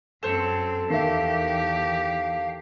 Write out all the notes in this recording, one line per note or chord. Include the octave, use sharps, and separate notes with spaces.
F#2 C4 A4 C5 C#5
E2 D#3 G4 E5 F5